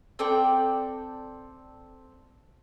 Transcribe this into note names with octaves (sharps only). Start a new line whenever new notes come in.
C4 A4 D5 G5